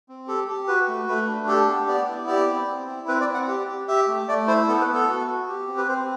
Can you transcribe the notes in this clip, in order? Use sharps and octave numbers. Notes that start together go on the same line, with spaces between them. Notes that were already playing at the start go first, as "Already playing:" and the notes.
C4
G4 A4
G4
F#4 B4
A3
A3 B4
D4
G4 A4
B3
B3 D5
E4
G4 D5
C4
C4
E4
C4 B4
D5
C4
F#5
G4
G4
G4 E5
A3
A3 D5
E4 C5
B3 A4
B4
B3
A4
F#4
F#4
G4
C4
B4
C4 C5